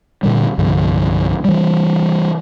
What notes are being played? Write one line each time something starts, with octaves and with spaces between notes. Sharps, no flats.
A#2 D3 G3
C2 G2 D3 F3
E3 G3